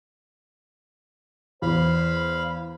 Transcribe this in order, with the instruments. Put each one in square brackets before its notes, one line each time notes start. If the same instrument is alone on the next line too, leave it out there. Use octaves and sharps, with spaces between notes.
[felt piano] E2 [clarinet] C5 [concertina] F5 B5